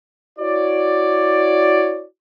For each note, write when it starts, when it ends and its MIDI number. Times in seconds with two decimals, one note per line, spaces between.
0.39 2.05 64
0.39 2.05 66
0.39 2.05 73
0.39 2.05 74